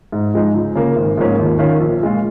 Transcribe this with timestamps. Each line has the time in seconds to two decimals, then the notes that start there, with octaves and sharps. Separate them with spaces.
0.12 G#2
0.34 F3 G#3 D#4
0.54 C#2
0.75 C#3 A#3
0.96 G#1
1.17 G#2 F3 A#3 C#4
1.38 D#2
1.59 D#3 C#4 F4
1.80 A#1
2.01 A#2 G#3 F4